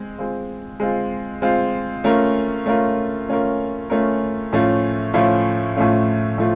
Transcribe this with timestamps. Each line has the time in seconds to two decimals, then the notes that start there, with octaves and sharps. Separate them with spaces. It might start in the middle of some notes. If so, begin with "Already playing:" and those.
Already playing: G#3 C4
0.18 G#3 C4 F4
0.80 G#3 C4 F4
1.42 G#3 C4 F4
2.04 A3 C#4 F4 A#4
2.66 A3 C#4 F4 A#4
3.29 A3 C#4 F4 A#4
3.90 A3 C#4 F4 A#4
4.53 A2 F3 A3 C#4 F4
5.14 A2 F3 A3 C#4 F4
5.76 A2 F3 A3 C#4 F4
6.38 A2 F3 A3 F4